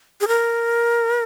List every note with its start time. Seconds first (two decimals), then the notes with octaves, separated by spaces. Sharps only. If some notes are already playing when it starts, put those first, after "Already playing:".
0.21 G#4
0.28 A#4